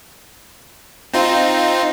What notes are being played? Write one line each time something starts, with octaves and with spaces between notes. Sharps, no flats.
C4 D#4 F4